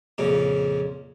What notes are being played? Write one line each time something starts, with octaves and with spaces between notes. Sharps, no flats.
F2 A#2 C#3